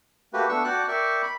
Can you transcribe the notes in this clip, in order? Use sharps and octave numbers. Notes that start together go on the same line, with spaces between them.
A3 A#3 F#4 G4 B4
A3 B3 D4 C#6 E6
F#4 D5 F#5 G5 A5 F#6
A#4 D5 E5 G5 C#6
B5